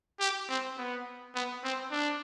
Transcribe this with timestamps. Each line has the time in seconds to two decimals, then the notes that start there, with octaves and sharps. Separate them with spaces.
0.20 G4
0.49 C4
0.78 B3
1.35 B3
1.64 C4
1.91 D4